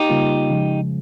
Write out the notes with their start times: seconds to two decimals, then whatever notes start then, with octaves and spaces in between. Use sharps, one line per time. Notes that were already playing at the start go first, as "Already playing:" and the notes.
Already playing: D#4 G4
0.09 C#3 G3 A#3 F4
0.50 C#3 F3 G#3